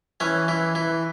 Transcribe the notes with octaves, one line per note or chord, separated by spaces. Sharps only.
E3 C#4
E3
E3